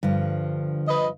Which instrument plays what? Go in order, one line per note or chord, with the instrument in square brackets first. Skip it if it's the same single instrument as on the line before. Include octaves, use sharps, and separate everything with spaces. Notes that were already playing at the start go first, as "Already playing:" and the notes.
[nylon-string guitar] G2 F3 [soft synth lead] D3
[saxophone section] B4 D#5